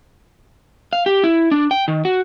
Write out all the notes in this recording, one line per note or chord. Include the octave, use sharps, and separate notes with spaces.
F5
G4
E4
D4
G5
D#3
F#4